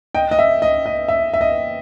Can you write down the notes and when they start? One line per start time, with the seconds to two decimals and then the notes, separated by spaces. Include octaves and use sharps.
0.15 D#5 G5
0.31 D#5
0.39 E5
0.62 D#5
0.86 D#5
1.08 E5
1.34 E5
1.41 D#5